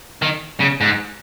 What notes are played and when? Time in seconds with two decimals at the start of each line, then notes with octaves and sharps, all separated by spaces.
0.22 D#3
0.60 C#3
0.81 G#2